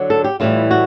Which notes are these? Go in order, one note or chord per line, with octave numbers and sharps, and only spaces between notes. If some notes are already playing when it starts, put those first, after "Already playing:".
Already playing: D3 F#3
A4
G4
A2 E3 G3 F4
F#4